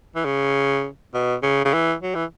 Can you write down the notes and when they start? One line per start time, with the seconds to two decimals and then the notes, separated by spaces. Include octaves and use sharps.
0.16 E3
0.25 C#3
1.14 B2
1.43 C#3
1.65 C#3
1.73 E3
2.02 F#3
2.15 E3